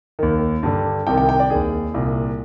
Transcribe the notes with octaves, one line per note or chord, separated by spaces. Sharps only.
D#2 D#3
G2 D3
C2 C3 D#3 G5
G5
G5
D5
D#2 D#3 G#4
C2 A#2